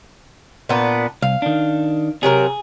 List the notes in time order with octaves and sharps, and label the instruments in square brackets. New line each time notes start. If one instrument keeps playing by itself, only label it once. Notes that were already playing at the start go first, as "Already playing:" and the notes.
[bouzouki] A#2 B3 D4
[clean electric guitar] C2 [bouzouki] F5
[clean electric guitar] D#3 D4
[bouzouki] C3 F#3 A#4 [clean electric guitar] G#4